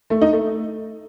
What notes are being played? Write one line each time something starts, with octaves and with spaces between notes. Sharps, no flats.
A3
D#4
A3